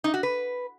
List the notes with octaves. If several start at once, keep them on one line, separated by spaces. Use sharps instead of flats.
D#4
F#4
B4